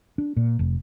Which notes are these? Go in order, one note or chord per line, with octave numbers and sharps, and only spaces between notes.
D4
A#2
F1